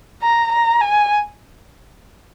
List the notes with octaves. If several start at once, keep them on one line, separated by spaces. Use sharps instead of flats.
A#5
A#5
G#5